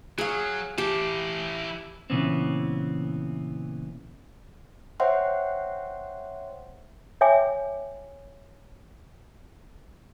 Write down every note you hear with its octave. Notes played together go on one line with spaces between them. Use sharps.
F#3 G#4 F5
E3 G4 A5
A#2 C#3 E3 B3 C4
C5 C#5 E5 F#5 G5 C6
C#5 E5 G5 G#5 D6